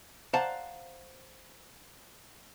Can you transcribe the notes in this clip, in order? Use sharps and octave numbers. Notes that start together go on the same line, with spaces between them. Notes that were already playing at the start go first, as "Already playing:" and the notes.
C5 D5 F5 F#5 A5 A#5